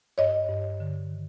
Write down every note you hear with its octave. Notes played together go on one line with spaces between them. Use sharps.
G2 C#5 D#5
G2
D3
D#3